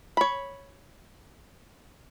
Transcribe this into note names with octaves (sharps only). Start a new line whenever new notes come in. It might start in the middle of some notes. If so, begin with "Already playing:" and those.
C#5 B5